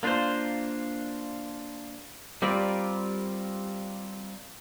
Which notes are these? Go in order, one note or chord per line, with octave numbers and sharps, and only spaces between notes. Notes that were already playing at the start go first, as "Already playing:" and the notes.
A#3 D4 F4 C5
G3 C4 F4 A#4 D5